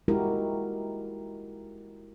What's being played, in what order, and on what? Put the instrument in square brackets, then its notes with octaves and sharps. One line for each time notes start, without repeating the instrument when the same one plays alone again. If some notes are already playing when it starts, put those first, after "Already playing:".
[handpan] G#3 D#4 E4 F#4 G4 A#4